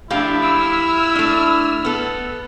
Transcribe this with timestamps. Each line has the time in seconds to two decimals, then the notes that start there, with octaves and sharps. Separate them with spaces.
0.10 F3 A3 D4 E4 G4 F5
0.44 E6 F6
1.15 A3 D4
1.85 B3 A4